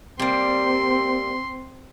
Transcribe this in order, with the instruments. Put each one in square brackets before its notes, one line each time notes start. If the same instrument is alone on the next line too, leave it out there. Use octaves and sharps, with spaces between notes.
[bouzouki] G3 A#3 [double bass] C4 [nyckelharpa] C6